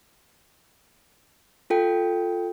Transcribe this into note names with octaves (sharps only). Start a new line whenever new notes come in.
F4 A4 G5